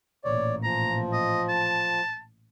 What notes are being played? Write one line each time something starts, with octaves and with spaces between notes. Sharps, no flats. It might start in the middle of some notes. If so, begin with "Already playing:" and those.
A1 A#2 C#5 D5
F3 A#5
D#5
A5